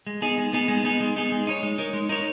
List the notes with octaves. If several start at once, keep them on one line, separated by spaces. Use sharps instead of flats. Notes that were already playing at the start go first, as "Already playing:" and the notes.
G#3
B3 D#4 G#4
G#3
B3 D#4 G#4
G#3
B3 D#4 G#4
G#3
B3 D#4 G#4
G#3
D#4 A#4 C#5
G#3
D#4 A#4 C#5
G#3
D#4 A#4 C#5